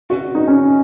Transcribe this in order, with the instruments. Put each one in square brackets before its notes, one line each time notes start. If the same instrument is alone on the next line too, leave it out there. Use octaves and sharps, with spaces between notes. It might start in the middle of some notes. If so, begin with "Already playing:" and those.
[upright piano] F#4
D#4
C#4